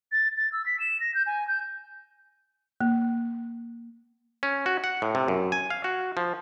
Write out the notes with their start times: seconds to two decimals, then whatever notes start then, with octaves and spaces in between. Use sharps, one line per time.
0.12 A6
0.37 A6
0.52 E6
0.66 B6
0.80 E7
1.00 A#6
1.14 G6
1.27 G#5
1.48 G6
2.81 A#3
4.43 C#4
4.66 F#4
4.84 F#5
5.02 A2
5.15 C3
5.28 F#2
5.52 G#5
5.70 F5
5.84 F#4
6.17 F3